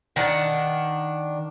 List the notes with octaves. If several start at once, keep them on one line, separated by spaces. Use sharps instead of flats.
D#3 D4 F#5 A5